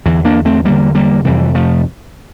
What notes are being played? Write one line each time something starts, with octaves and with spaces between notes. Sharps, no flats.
E2 D3 E3
A#3 D4
A3 C4
E2 D3 G3 A#3
G3 A#3
F2 C3 E3 G3
F3 A3